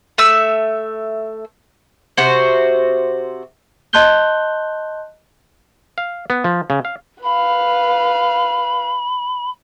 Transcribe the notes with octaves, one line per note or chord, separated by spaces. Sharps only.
A3 E5 E6
C3 F#4 C5
D#5 A5 C6 F#6 G6 G7
F5
B3
F3
C#3
F5
B4 F5 B5